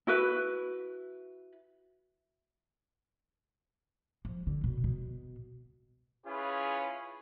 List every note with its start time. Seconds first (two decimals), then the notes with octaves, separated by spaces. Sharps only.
0.07 E4 F#4 B4
4.25 F3
4.47 D3
4.64 B2
4.84 B2
6.26 C#4 E4 F4 G#4 B4